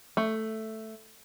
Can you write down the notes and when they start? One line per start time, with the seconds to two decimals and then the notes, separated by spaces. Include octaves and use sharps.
0.17 A3